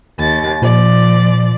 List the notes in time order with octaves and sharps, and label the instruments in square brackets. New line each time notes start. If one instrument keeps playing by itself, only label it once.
[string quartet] D#2 A6
[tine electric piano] A#2 [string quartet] F3 D5